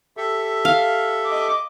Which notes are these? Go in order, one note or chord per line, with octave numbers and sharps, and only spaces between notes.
G4 A4 E5
F5
D#5 D6